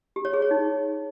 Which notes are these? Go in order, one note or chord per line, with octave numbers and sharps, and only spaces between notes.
G4
C#5
G#4
C#5
D#4